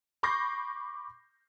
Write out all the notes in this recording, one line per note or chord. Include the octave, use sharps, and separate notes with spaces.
B5 C#6 D6 G6 A#6 C7